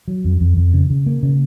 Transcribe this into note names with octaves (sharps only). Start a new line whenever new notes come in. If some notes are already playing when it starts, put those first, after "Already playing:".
F#3
F2
F2
F2
C#3
C#3
A#3
C#3